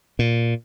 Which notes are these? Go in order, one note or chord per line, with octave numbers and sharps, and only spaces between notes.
A#2